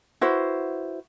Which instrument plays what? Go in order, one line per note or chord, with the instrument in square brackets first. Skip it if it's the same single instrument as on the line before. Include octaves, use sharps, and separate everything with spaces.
[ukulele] E4 F#4 B4 C5